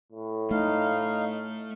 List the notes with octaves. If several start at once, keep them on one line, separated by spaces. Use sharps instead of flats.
A2
A3 D#4 F5